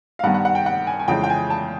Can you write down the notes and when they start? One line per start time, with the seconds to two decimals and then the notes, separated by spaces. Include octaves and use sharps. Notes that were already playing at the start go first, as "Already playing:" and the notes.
0.19 F5
0.23 G2 D#3 G3 B3 F#5
0.34 F#5
0.45 F#5
0.55 G5
0.66 F#5
0.87 G#5
1.00 G#5
1.08 F2 C#3 E3 G#3 G5
1.24 G5
1.30 G#5
1.50 A5